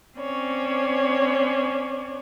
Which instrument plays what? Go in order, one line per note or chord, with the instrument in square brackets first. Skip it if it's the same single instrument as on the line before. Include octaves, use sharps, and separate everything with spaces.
[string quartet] C4 C#4 C#5 D5